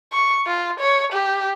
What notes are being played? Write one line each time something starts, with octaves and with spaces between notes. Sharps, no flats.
C#6
F4
C#5
G4